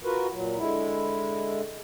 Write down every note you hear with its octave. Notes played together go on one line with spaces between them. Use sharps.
F4 F#4 A#4 B4
A#2 F#3
D3 G#3 E4